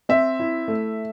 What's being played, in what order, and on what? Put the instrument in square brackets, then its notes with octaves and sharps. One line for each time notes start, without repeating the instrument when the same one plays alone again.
[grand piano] C4 E5
E4
A3